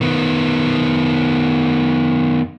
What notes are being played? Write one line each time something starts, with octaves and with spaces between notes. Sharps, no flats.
D#3 B3